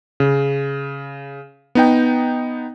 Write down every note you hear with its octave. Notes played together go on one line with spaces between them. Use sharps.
C#3
B3 D#4 G5